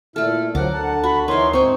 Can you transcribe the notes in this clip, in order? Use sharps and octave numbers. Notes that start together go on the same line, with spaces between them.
A#2 A3 E4 A4 F6
D2 F3 F#3 A#4 F#5 D6
D3 A5
F#4 B5
E3 D#4 E4 A#4 C#5 C6
G#2 C4 D#4 C#6